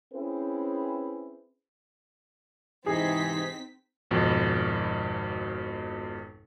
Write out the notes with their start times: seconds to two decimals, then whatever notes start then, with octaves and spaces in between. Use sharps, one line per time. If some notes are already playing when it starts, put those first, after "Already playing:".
0.14 C4 C#4 E4 G#4 B4 C5
2.86 G#2 C3 E3 C4 D#4 G#4 B6
4.11 G#1 F2 B2